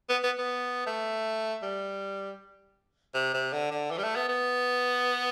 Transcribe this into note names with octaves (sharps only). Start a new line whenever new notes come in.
B3
B3
B3
A3
G3
C3
C3
D3
D3
E3
G3
A3
B3
B3